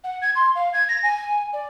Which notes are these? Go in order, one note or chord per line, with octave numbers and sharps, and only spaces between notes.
F#5
G#6
C6
F5
G#6
A#6
G#5
D5